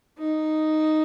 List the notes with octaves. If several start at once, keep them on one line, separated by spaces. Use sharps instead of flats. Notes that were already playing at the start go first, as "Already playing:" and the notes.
D#4